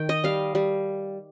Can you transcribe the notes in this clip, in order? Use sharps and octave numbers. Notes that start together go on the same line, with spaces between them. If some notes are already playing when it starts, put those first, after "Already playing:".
Already playing: D#3 G5
D#5
G3 F5
G3